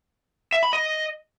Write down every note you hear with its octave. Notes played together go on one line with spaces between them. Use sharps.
E5
B5
D#5